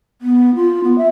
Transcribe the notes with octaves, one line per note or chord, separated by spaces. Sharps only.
B3
F4
B3
E5